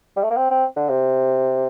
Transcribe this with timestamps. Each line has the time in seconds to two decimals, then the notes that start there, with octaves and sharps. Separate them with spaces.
0.16 G3
0.23 A3
0.30 A#3
0.37 C4
0.51 C4
0.76 D3
0.89 C3